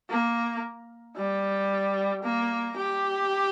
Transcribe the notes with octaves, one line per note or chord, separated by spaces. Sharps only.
A#3
G3
A#3
G4